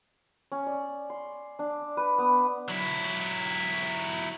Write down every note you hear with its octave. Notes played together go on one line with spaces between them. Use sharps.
C#4
D5
C6
D4
B4
B3
F#3 E4